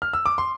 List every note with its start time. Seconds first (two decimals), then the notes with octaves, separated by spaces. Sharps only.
0.02 F6
0.13 E6
0.26 D6
0.38 C6